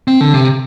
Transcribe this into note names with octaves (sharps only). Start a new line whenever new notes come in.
C4
D3
C3